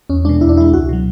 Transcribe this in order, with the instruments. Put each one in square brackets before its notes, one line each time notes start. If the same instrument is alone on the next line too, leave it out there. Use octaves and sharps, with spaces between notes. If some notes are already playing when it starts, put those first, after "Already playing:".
[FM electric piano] E2 C#4
B2 G#3 D4
E2 E4
D4
B2 E4
G#3
C#2 F#4
B2 F#3